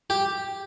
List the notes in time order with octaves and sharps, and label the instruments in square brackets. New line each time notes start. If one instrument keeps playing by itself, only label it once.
[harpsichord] G4